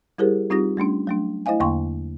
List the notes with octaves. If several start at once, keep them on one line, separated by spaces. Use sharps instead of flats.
G3 E4 G4 G#4 A#4 C5
G3 C4 D#4 F4 G4 A#6
G3 A3 C#4 D4
F#3 A3 D4
A3 E4 C5 D#5 F5 G#5
E2 D3 A#3 G5 C6 C#6